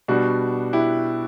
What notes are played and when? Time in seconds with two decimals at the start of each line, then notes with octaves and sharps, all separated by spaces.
0.08 B2 G3 D4 F#4
0.73 E4 G4